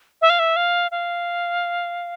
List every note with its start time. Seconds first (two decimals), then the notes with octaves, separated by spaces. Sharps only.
0.22 E5
0.30 F5
0.39 E5
0.56 F5
0.91 F5